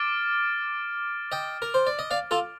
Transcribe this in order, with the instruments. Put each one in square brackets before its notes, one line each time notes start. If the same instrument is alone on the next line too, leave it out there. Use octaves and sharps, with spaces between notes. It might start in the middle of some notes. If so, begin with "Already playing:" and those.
Already playing: [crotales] D6 F6 A6 D7
[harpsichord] D#5 G5
A#4
C5
D5
D#5
D5 F5
F4 A4